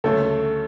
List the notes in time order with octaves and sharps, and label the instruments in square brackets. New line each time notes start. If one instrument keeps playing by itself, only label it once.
[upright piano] D2 C#3 F#3 A3 [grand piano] A4